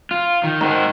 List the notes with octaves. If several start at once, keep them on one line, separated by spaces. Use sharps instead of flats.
F4
D#3
G#2 D#3 F#4 C5